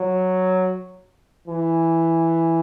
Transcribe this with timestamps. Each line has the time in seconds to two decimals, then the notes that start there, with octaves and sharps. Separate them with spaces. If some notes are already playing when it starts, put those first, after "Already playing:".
Already playing: F#3
1.48 E3